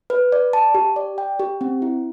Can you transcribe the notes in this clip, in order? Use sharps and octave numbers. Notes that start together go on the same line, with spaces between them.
B4
D5
A5
G4
D5
G5
G4
C4
E4